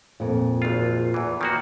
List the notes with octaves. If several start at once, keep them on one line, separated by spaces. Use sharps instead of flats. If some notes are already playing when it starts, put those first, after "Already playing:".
F2 A#2
G#1 F4
E2 E3
D#3 A#3 F#4